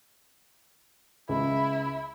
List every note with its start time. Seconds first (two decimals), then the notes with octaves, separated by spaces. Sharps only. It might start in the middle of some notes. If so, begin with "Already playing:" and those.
1.29 C#2 E4